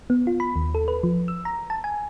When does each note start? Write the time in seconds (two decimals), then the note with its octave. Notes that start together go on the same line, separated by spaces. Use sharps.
0.10 B3
0.27 F4
0.40 B5
0.56 D#2
0.75 A4
0.88 B4
1.03 F3
1.28 E6
1.45 A#5
1.70 A5
1.84 G#5